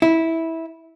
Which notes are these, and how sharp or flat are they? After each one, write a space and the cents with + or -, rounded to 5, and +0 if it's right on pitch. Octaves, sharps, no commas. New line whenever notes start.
E4 -15